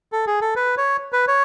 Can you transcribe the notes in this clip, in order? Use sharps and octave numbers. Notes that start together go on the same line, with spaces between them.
A4
G#4
A4
B4
C#5
B4
C#5